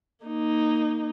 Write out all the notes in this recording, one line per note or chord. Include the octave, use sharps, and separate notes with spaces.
A#3 D#4